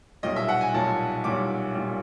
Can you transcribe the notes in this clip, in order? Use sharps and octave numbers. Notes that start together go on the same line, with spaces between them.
B1 A#2 G3 D#5
E5
F#5
G#5
B1 A#2 G3 A5
B1 A#2 G3 D6
A#2 G3